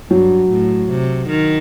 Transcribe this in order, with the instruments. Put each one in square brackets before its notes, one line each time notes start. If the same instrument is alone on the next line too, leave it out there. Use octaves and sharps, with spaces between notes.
[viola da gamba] G2 [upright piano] F#3
[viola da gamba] A2
C3
D#3